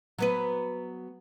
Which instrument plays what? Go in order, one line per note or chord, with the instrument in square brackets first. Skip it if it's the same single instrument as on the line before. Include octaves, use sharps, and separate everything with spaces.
[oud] F#3 B3 B4